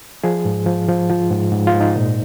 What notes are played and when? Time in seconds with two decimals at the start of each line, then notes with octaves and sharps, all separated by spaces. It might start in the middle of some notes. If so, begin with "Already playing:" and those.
0.24 F3 G#4
0.45 G#2
0.66 F3
0.88 F3
1.10 F3 F4
1.30 G#2
1.52 G#2
1.67 F4
1.74 G#2
1.81 D#4
1.96 A#2